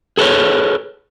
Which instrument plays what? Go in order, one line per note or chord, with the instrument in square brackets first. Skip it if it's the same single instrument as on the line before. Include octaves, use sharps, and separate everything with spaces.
[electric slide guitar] G#4 A4 B4 C#5